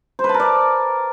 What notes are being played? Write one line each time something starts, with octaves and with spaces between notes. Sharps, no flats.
C5
B4
A5
A#4
D5